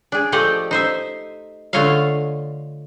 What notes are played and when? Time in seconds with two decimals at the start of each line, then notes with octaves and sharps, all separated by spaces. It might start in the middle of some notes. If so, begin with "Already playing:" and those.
0.12 D4 G#4
0.32 F3 A3 G4 A4 D5 D#5
0.71 D#4 C5 E5
1.73 D3 A3 F4 C#5 D#5 F5